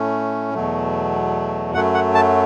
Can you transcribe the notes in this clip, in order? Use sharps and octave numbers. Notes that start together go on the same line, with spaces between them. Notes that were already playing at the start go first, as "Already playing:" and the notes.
Already playing: A2 A3 C#4
E2 B2 F#3 A3
F#2 F#3 A3 F#5
F#5
A5